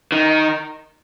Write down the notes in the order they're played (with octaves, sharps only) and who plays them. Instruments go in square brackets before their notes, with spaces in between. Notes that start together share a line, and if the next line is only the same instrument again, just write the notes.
[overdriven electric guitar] D#3